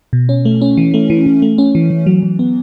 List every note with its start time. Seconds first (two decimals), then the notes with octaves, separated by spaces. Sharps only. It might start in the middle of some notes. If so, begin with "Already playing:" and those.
0.13 B2
0.29 C#4
0.45 A3
0.61 C#4
0.77 E3
0.94 A3
1.10 E3
1.26 E3
1.42 A3
1.58 C#4
1.75 E3
1.90 E3
2.06 F#3
2.23 F#3
2.39 B3